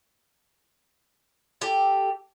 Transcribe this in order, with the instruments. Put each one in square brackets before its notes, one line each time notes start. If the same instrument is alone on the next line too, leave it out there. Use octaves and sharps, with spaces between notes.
[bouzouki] G4 A4